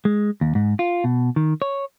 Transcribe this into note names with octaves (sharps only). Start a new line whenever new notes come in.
G#3
D#2
G#2
F4
B2
D#3
C#5